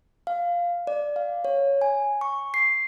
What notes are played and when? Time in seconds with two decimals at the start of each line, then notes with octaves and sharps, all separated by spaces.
0.27 F5
0.87 D5
1.16 F5
1.45 C#5
1.81 G#5
2.21 C#6
2.54 C7